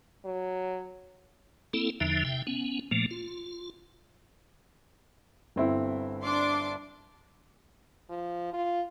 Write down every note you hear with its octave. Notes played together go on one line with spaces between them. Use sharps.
F#3
A#3 C4 E4 A4
E2 D3 F3 D#4 E5
C3 E5 G5
B3 C#4
A#2 F3 A3 A#3
F4
G1 C4 E4
D4 C6 D6
F3
F4